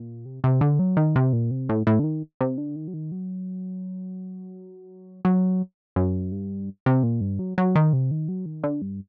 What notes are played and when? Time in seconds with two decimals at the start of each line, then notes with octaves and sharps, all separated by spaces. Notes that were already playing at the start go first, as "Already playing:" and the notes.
Already playing: A#2
0.26 C3
0.44 C3
0.61 D3
0.79 F#3
0.97 D#3
1.16 C3
1.33 A#2
1.51 C3
1.69 A2
1.87 A2
1.99 D3
2.04 D#3
2.41 C3
2.58 D3
2.76 D#3
2.88 F#3
2.94 D#3
3.12 F#3
5.25 F#3
5.96 F#2
6.32 G2
6.86 C3
7.03 A#2
7.21 G2
7.39 F#3
7.58 F#3
7.75 D#3
7.93 C3
8.11 D#3
8.28 F#3
8.46 D#3
8.63 D3
8.82 G2